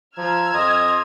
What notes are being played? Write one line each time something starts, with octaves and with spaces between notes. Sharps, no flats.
F3 A#5 E6 F6 G#6
F2 D#5 C6